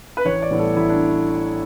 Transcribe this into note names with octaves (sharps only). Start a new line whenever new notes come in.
B4
A1 C#5
D5
A2 E3 G3 B3
A4
A1 E4
D4